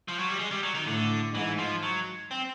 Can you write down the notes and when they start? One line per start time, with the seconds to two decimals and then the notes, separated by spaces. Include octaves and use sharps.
0.08 F3
0.19 F#3
0.29 G3
0.39 G#3
0.51 G3
0.63 F#3
0.75 D#3
0.87 A2 D3
1.35 G#2 E3
1.59 F3
1.83 F#3
2.31 C4